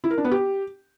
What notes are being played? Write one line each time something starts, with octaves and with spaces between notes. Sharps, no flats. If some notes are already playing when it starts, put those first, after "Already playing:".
E4
A#4
D4
B3
G4